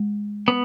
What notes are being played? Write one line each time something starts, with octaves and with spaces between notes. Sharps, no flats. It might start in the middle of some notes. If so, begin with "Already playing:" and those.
Already playing: G#3
B3